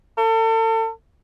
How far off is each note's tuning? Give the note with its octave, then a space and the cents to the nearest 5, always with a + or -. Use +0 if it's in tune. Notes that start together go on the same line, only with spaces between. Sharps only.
A4 +35